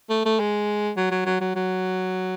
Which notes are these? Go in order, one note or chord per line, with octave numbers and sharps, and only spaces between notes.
A3
A3
G#3
F#3
F#3
F#3
F#3
F#3